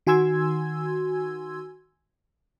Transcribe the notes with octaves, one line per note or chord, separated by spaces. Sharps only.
D#3 F#4 G#5 C6 E6 G#6